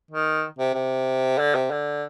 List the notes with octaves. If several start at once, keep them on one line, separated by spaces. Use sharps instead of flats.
D#3
C3
C3
D3
C3
D3